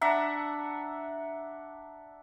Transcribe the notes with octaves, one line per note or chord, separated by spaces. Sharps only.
D4 E5 F#5 A#5